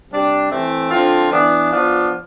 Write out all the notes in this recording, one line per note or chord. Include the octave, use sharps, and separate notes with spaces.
C3 G3 D4 G4
E3 A3 C4
D3 F3 C4 F4
E3 B3 D4
F3 B3 D4 F4